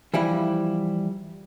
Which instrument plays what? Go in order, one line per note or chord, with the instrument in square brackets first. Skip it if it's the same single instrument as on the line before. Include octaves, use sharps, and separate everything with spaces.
[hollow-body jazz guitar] E3 F3 G3 E4